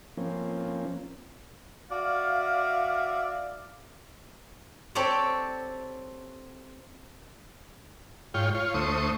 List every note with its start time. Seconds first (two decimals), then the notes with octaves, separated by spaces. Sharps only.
0.17 F3 A#3 C4 C#4
1.91 F#4 D5 E5 F5
4.95 C4 G4 A4 C#5 D5
8.34 G#2 F4 C#5 G5
8.55 F4 C#5
8.74 D2 A3 C5 C#6 D#6